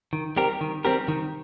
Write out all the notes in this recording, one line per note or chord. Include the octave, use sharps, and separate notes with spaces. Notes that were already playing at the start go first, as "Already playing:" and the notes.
D#3
G3 C4 G4 A#4
D#3
G3 C4 G4 A#4
D#3